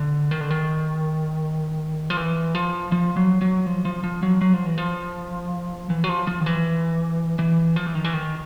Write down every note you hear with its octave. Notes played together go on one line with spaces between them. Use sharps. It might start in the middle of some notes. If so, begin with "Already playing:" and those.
Already playing: D3
D#3
D3
D#3
F3
E3
F3
F3
F#3
F#3
F3
F3
F3
F#3
F#3
F3
E3
F3
E3
F#3
F3
F3
D#3
E3
E3
F3
E3
D#3
E3
D#3